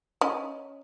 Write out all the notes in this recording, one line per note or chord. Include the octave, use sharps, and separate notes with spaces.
C#4 D#5